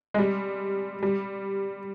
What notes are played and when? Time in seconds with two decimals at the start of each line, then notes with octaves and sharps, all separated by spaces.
0.14 G#3
0.18 G3
1.03 G3